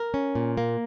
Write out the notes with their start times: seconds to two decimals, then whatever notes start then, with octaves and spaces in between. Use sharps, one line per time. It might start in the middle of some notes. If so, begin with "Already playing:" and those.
Already playing: A#4
0.14 C#4
0.35 A#2
0.57 A#3